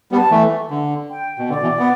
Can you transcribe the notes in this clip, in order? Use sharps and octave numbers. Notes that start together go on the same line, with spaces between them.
G3 B3
A5
E3 A3
D3
G5
B2
D3 D5
B2 E3
B3